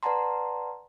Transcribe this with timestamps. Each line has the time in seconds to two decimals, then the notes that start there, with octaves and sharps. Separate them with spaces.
0.03 B4 D5 F#5 A5 A#5 C6